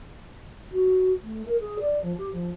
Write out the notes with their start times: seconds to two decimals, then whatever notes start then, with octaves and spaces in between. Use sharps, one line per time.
0.71 F#4
1.23 A3
1.46 A#4
1.60 G#4
1.80 D5
2.02 F3
2.18 G4
2.32 F3